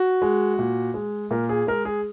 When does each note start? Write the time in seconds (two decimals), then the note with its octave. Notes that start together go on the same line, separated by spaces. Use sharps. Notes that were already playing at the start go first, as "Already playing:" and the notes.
Already playing: F#4
0.22 G#3
0.59 A#2
0.94 G#3
1.31 A#2 A#4
1.49 G#4
1.67 G#3 A#4
1.85 G#4